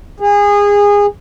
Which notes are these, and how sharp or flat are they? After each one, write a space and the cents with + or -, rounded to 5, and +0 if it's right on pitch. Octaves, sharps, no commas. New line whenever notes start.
G#4 -25